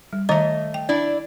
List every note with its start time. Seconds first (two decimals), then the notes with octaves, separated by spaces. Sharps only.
0.13 G3
0.29 D#3 A3 D#5 A#5
0.74 G5
0.89 D4 E4 D5